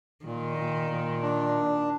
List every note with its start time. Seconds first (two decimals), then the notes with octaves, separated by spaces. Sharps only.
0.25 A#2 D#3
0.58 A#2
0.90 A#2
1.22 D4